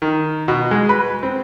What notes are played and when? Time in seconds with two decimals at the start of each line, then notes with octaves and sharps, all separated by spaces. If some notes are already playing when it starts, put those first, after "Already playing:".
0.02 D#3
0.48 B2
0.71 G#3
0.89 B4
1.23 C4